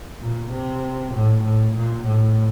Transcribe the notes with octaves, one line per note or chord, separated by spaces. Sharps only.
A#2
C3
A2
A2
A#2
A2